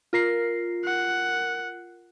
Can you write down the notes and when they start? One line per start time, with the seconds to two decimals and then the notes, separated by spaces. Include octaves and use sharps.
0.13 F4 A#4 C7
0.84 F#5